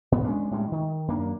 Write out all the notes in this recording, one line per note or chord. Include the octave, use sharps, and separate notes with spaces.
A2 B3
G#3 A#3 C#4 D4
A2 G3 G#3
D#3
F#2 A#3 D4